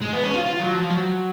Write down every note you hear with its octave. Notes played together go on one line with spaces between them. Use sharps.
G#3
B3
C#4
F4
F4
F#3
F3
F#3